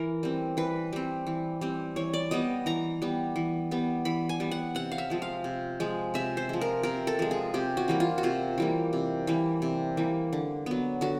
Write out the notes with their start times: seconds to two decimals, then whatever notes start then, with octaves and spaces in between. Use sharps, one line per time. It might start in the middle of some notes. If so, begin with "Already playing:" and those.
Already playing: E3 A#4
0.23 G3 C4
0.57 E3 B4
0.93 G3 C4
1.27 E3
1.61 G3 C4
1.96 E3 C#5
2.14 D5
2.31 G3 B3 D#5
2.66 E3 A#5
3.02 G3 B3
3.36 E3
3.71 G3 B3
4.05 E3 B5
4.29 G#5
4.40 G3 B3
4.51 F#5
4.75 C3 F#5
4.92 F5
4.98 E5
5.10 F3 G#3
5.22 F5
5.44 C3
5.80 F3 G#3
6.14 C3 E5
6.37 C5
6.49 F3 G#3
6.61 A#4
6.83 C3 A#4
7.07 A4
7.19 F3 G#3
7.31 G#4
7.54 C3 G4
7.77 F#4
7.88 E3 G3 A#3
8.00 F4
8.18 F#4
8.23 C3 F4
8.58 E3 G3 A#3
8.93 C3
9.27 E3 G3 A#3
9.62 C3
9.97 E3 G3 A#3
10.33 D3
10.66 F#3 B3
11.01 D3 F#4